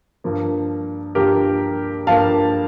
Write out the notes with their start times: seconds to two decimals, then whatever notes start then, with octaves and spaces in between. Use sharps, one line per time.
0.24 G2 F3 A#3
1.15 G2 F3 A#3 G4 A#4
2.07 G2 F3 A#3 F5 A5